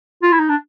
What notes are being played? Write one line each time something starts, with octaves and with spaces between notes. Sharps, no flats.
F4
E4
D#4
D4